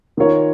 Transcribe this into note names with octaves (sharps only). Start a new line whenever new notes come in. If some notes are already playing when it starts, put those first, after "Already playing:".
D#3 A#3 F4 A#4 C#5